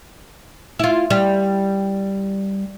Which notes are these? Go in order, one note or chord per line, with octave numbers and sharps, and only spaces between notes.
E4 F4
G3